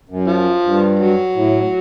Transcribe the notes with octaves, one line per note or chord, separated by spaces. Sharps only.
F#2
F3
G2
F#3
A2